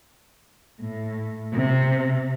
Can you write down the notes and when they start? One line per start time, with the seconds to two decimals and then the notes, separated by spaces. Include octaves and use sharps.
0.80 A2
1.53 C3